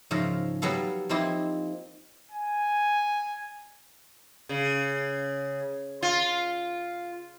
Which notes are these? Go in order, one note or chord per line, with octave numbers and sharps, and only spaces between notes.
G#2 C#3 F3 A#4 E5 F5
F#3 G3 B3 A4 F5
F3 A#3 C4 D#4 E4 G4
G#5
C#3
F4